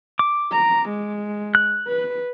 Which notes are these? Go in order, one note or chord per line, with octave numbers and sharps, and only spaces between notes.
D6
A#5
G#3
F#6
B4